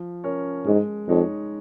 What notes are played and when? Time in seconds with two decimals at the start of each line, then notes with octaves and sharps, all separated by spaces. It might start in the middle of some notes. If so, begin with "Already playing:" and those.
Already playing: F3
0.24 C#4 A#4 C#5
0.66 G#2 G#3
1.08 F2 D#4 C#5